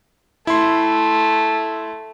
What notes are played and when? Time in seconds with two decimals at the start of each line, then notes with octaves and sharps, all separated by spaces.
0.47 A3 E4 C6